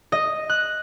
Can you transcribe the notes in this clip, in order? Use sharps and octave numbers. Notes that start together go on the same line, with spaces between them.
D#5
F#6